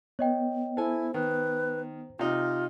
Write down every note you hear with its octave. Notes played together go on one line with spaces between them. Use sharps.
B3 C#5 D#5 G5
E4 A4 C5 G#5
D#3 B4
C3 D#4 F4